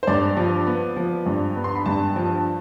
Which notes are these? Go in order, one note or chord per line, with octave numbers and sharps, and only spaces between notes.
C5
G2 D5
F3
B3
F3
G2
B3
C6
B5
G2 A5
F3